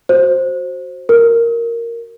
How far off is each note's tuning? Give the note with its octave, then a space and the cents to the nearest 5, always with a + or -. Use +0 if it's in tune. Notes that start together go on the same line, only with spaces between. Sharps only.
F#4 +0 C5 +10
F#4 +0 A#4 -5